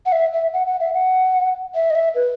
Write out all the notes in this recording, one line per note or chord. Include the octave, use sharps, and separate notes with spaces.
F#5
E5
E5
F#5
F#5
E5
F#5
E5
D#5
E5
B4